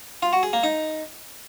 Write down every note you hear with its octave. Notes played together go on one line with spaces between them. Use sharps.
F4
F#4
G#4
A#3
D#4